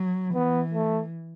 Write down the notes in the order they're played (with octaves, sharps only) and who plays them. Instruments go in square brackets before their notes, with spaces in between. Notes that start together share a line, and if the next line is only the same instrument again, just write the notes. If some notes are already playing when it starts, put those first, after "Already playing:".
Already playing: [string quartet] F#3
[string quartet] E3 [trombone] B3
[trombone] A3